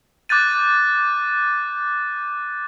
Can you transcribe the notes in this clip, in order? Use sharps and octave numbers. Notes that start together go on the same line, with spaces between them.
D6 F#6 G6 A6 D#7